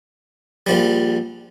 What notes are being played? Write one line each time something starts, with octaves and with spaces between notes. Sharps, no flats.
A#1 F3 G3